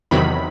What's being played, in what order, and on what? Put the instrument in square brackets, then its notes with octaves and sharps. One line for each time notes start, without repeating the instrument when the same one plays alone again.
[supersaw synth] E2 C3 D#3 F#3 B5